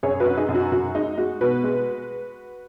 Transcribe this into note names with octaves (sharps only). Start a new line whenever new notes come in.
F#2 G#4 C#5
F#4 B4
F#2
D#4 G#4
F#2
F#4
F#2 F#4
G#3 D#4
G#3 F#4
B2 F#4 B4
G#3